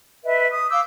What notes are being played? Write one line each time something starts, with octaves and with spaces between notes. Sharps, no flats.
B4 D#5 E5
D#6
F5 D6 E6 G6